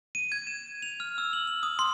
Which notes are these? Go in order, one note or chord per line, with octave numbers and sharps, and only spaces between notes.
D#7
G#6
E7
F7
F6
E6
F#7
F#7
D#6
C6